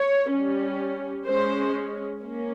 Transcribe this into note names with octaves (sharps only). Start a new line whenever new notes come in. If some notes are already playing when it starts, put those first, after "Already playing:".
Already playing: C#5
G3 C#4
G#3 C#4 C5
A#3 C#4